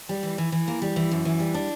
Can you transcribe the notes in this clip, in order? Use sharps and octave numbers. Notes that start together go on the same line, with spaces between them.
G3
E3
E3
E3
A#3
G3
E3
F#2
E3
G3
D4